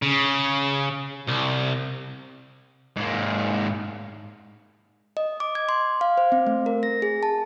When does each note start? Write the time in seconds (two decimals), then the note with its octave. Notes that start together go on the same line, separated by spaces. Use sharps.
0.02 C#3
1.28 C2
2.96 G#2 A#3
5.17 D#5
5.40 D6
5.55 G#6
5.69 C6
6.01 F5
6.17 C5
6.32 C4
6.47 A3
6.66 A#4
6.83 A#6
7.02 G#4
7.23 A5